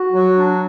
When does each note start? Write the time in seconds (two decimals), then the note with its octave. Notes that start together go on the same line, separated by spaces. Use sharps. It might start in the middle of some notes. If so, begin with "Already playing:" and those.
Already playing: F#4
0.11 F#3
0.36 D4